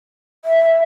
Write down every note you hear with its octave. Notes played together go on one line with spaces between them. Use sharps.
E5